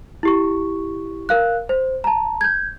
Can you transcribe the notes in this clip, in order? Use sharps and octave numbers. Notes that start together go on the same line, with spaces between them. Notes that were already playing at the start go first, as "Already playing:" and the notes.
E4 G4 C#6
A#4 F5 F#6
C5
A5 A#5
G6 G#6